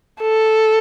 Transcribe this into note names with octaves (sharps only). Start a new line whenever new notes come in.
A4